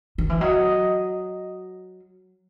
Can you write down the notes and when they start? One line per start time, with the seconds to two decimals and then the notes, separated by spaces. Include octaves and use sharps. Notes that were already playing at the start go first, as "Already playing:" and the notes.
0.18 D#3
0.30 E3
0.41 F#3 D#5